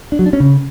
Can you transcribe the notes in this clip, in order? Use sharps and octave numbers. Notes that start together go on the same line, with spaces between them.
D4
F#3
D4
C#4
C#3